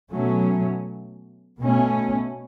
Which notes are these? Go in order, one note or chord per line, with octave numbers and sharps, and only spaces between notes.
B2 F#3 A3 C#4
B2 A3 C#4